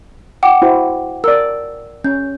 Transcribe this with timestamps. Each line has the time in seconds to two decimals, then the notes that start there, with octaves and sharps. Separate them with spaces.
0.43 F#5 G5 D6
0.62 E4 F#4 C5
1.24 A#4 D5 E6
2.04 C#4 G6